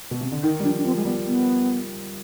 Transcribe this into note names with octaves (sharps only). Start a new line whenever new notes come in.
B2
C3
D3
D#3 D#4
G3
F3 D4
D4
F3 C4
G#3
G3 B3
B3